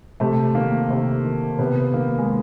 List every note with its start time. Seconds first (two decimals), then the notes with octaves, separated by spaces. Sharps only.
0.20 C3 A3
0.55 D#3 A#3
0.90 C3
1.24 D#3
1.59 C3 B3
1.94 D#3 A#3
2.19 G#3